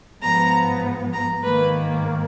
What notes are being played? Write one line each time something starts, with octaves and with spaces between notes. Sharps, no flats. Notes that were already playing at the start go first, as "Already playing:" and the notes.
G#2 F3 B3 A#5
A#5
G#2 D#3 A#3 B4